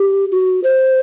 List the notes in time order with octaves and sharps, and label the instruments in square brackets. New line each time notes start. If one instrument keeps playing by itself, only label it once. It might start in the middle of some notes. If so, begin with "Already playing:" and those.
Already playing: [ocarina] G4
F#4
C5